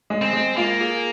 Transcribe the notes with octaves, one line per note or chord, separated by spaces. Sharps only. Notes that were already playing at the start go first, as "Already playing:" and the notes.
G#3
C4
G#3
A#3 F4
G#4